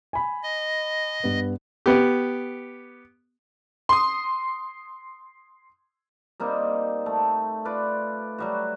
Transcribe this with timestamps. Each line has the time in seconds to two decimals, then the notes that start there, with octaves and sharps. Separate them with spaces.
0.13 G#5 B5
0.43 D#5
1.24 G2 B3
1.86 B3 G4
3.89 C6 D#6
6.40 G3 A#3 C4 D#4
7.06 A3
7.65 F4 B4 D5
8.38 F#3 G3 F#4